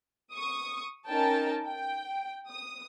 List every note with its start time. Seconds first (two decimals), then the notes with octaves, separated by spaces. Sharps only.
0.32 C#6 D#6
1.06 C#4 D#4 A#4 G5 A5
1.67 G5
2.48 D#6